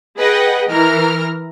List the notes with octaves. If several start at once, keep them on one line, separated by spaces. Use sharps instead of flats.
G#4 B4 D#5 F#5 G5
E3 A#4 A#5 F6